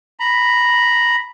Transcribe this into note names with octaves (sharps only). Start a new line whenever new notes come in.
A#5 B5